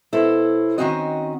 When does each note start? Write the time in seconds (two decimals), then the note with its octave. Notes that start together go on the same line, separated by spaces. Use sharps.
0.12 B2 E4 A4 C5 C#5
0.78 D#3 E3 C4 C#4 F#4 D#5